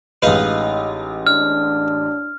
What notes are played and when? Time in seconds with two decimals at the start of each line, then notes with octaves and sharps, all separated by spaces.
0.22 A1 G#3 D#4 B4 F5
1.27 D4 F6